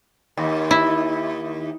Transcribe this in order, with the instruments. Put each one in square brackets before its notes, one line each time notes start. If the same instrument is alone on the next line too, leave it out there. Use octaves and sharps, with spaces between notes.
[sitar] D#2
[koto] E4